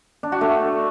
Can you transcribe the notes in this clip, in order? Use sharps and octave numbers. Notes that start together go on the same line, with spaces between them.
D4
F#4
A3